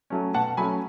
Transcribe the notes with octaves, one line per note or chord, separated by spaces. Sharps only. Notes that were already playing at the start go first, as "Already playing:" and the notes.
F#3 A3 C#4
B2 F#5 A5
F#3 A3 C#4 G#5 B5